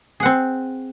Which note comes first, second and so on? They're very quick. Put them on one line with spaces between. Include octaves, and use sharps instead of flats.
G#4 F#5 C4